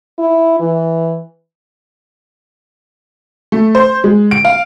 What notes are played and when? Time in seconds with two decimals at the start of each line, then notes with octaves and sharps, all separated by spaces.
0.19 E4
0.60 E3
3.52 A3
3.75 C5
4.04 G#3
4.31 D7
4.45 F5